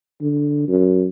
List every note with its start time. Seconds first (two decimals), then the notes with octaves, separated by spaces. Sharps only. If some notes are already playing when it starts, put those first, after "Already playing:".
0.21 D3
0.68 F#2